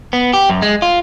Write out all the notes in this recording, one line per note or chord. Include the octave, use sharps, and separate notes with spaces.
B3
G4
F#2
G#3
F4